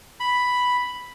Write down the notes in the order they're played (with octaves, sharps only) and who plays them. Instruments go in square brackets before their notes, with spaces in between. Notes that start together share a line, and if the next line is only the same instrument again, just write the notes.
[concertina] B5